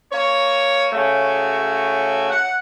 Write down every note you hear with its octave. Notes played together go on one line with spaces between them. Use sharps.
A#3 C#5
C#3 A3 F#4
F#5